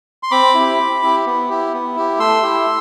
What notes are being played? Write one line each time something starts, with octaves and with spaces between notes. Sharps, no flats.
C6
C4 B5 D6
E4 G4
C4
E4 G4
B3
E4 G4
B3
E4 G4
A3 C6 E6
E4 G4